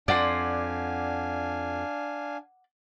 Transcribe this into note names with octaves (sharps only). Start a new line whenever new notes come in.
F2 D4 D5 F5 F#5 G#5 C6